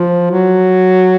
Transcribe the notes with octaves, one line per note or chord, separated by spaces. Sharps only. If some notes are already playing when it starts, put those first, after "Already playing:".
Already playing: F3
F#3